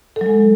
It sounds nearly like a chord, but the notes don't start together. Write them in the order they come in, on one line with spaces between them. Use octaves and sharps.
A4 F#3 G#3